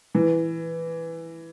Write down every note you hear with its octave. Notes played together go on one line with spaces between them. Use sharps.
E3